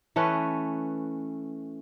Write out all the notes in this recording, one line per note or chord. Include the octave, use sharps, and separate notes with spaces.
E3 A3 C#4 B4